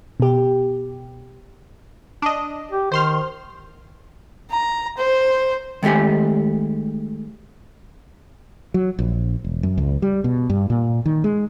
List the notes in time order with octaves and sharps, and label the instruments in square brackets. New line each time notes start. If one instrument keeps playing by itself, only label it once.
[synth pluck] B2 G4
[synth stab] D4 D#5
[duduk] G4
[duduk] D#3 [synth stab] C5 C6 F6
[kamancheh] A#5
C5
[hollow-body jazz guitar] D#3 G#3 A3 G4 G#5
[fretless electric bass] F#3
A#1
E1
F#2
C#2
G3
B2
G2
A#2
D#3
G#3